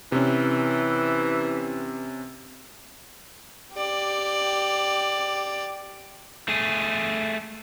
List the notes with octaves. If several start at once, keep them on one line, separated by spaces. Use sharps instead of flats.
C3 E3 C#4
G4 D5
A3 G#4